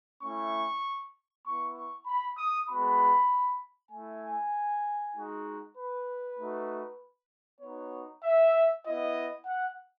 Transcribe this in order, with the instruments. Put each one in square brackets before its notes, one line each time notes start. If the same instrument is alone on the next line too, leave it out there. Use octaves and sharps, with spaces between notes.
[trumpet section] A3 C#4 E4 C#6
B3 E4 C#6
C#6
B5
D#6
G#3 B3 F#4 B5
A3 E4 G#5
G#3 D#4 F#4
B4
A3 D#4 F#4
B3 D#4 F#4 C#5
E5
B3 E4 D#5
F#5